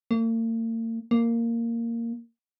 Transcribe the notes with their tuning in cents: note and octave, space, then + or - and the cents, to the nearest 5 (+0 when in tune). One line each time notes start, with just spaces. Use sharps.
A#3 -45
A#3 -10